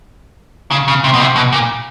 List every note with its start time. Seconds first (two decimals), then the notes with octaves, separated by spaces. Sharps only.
0.71 C#3
0.88 C#3
1.04 C3
1.13 B2
1.20 C3
1.36 B2
1.53 A#2